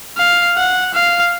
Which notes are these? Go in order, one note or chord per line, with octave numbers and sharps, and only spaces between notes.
F5
F#5
F5